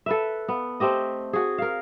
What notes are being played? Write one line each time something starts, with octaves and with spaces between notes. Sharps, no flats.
A4 B4 E5
B3
A3 C4 G4 D#5
F#4 G#4
A#4 F5